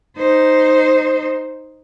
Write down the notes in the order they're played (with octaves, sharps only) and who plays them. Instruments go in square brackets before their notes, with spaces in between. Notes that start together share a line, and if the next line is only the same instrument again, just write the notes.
[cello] D#4 C5